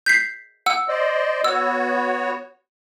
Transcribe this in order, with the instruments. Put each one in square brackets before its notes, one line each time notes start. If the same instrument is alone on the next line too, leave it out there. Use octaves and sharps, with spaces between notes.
[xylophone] G6 B6 C7
F#5 E6
[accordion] C5 D5 D#5
[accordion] B3 F#4 C#5 [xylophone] E6